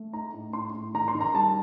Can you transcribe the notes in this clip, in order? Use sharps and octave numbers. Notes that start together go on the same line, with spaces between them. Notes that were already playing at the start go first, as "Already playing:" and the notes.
Already playing: A3
D#4 A#5
A2
A2 C6
A2
D#3 A#5
C6
D#3
A#5
G3 A5